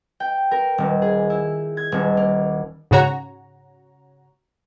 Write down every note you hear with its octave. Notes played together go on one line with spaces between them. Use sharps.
G5
A#4
D#1
G#4
E4
G#6
D#1
A#3
G#2 C#3 F#4 C#5 A#5